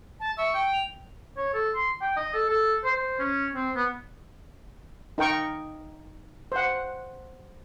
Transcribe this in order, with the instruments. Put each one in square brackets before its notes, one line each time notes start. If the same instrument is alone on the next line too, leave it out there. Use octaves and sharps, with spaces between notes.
[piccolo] A5
[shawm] E5 [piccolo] C#6
[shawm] G5
[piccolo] F7
[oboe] C#5
A4
C6
G5
D#5
A4
A4
C5
C5
C#4
C4
B3
[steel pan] D#4 A#4 G5 C#6
C5 F#5